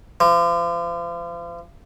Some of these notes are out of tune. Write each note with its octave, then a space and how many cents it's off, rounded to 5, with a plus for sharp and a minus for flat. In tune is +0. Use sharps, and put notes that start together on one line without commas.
F3 -35